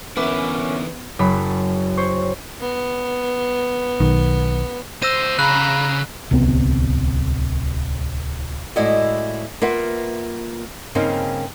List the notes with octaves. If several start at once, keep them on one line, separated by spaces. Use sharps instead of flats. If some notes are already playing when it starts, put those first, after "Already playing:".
D3 E3 B3 C#4 E4 A#4 E5 D6
F#1 F#2 B5
C5 C#5 C#6
B3
B1 D#3
C#2 C5 E6 A#6 D#7
C#3 A#5 B5 F#6
D1 C2 C3 B3
A2 G#3 E4 F#4 D5 D#5
A#3 F4 B4 E5 F#5
G2 C#3 A#3 C4 C#4 D#4